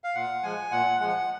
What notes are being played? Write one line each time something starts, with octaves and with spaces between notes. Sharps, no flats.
F5
A#2 F#5
F3 G#3 G#5
A#2 F#5
F3 G#3 F#5